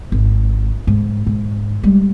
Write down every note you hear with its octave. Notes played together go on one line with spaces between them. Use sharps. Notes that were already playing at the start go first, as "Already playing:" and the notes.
G#1
G#2
G#2
G3 G#3